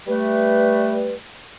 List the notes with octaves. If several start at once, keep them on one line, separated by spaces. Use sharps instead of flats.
G3 A3 B4